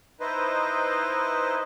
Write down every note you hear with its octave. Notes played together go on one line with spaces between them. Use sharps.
D#4 E4 B4 C5 D#5